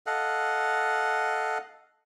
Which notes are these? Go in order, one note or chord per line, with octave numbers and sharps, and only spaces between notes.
A4 D#5 F5 F#5